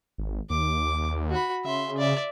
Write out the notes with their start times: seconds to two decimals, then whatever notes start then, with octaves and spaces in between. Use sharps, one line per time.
0.18 G#1
0.50 D#2 D6
1.31 F#4 B5
1.65 C#3 E5 C6
1.98 D5 E5